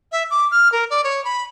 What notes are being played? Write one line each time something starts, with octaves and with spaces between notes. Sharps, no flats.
E5
D6
F6
A#4
D5
C#5
B5